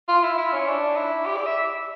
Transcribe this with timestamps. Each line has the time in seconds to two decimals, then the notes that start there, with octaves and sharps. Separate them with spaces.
0.08 F4
0.23 E4
0.37 E4
0.52 C#4
0.67 D4
0.97 E4
1.26 G4
1.36 D5
1.46 E5